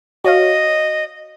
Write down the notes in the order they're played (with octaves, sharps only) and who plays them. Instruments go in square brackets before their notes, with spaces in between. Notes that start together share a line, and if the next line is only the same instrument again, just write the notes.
[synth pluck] F#4 C#5 F5 [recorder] D#5